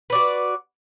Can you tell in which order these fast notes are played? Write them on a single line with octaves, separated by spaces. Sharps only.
B4 D5 F#4